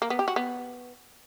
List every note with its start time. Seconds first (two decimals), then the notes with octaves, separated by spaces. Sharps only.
0.02 A#3
0.10 B3
0.19 G4
0.28 F#4
0.36 B3